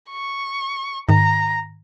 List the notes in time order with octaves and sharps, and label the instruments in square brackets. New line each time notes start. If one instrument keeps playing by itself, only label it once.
[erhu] C#6
[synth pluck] G#2 D#3 [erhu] A#5